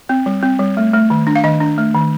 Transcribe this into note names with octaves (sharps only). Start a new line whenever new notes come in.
C4
G3
C4
G3
A3
A3
D#3
D4
F5
D#3 D#5
D4
A3
D#3